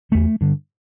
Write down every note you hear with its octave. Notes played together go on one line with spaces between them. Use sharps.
E2 D3 A3
G2 D3